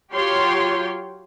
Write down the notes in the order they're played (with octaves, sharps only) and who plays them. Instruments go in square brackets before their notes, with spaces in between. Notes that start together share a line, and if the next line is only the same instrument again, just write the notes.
[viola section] F#3 F4 G4 C#5 G5 C6